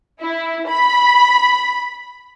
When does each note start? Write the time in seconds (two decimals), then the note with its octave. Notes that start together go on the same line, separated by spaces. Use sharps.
0.21 E4
0.69 B5